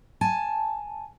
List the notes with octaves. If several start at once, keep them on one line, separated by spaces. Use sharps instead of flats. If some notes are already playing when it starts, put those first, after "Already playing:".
G#5 A5